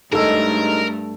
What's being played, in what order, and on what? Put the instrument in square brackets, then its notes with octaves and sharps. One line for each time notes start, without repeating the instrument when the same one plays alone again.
[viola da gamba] G2 A3 [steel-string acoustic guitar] G#3 C#4 D#4 [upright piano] A4 E6 [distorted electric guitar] A#4